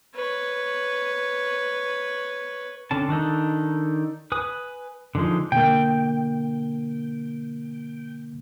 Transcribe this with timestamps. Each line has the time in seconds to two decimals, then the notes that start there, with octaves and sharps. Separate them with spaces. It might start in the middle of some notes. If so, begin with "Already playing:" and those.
0.15 B4 C#5
2.91 D3 C4 C#4 A5
3.09 D#3 D4 D#4 A4
4.32 B4 G#5 D#6
5.15 D3 E3 F3 G#3 D#4
5.52 B2 D3 A#3 G5